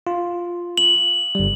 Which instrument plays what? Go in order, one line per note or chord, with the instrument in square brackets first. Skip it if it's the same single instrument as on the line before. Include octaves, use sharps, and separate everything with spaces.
[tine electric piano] F4
[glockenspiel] F#7
[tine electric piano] G1 G3